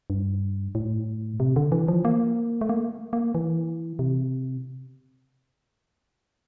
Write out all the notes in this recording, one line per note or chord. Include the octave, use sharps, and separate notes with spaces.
G2
A2
C3
D3
E3
F3
A#3
A3
A#3
A#3
E3
C3